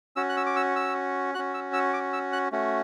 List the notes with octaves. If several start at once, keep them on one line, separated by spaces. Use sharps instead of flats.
C#4 F#4 E6
F#6
E6
D6
E6
E6
C#4 F#4 F#6
E6
E6
D6
E6
F#6
A3 C#4 F#4